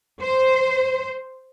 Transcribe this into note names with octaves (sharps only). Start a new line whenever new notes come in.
C5